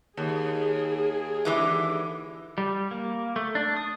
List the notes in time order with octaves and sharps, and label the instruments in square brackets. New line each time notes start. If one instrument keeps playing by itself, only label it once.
[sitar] D#2 [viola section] G#4
[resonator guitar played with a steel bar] D3 E3 G#3
[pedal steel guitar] G3
A#3
A3
D4
D#6